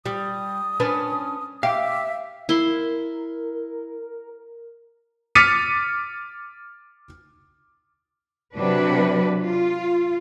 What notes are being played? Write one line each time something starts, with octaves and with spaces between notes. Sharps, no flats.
G3 D#6
C#4 D4 B4
G4 E5 F5 D6
E4 A#4 C6
D6 F6 A6 B6 C#7 D#7
C3 F#3 D4 B4
F4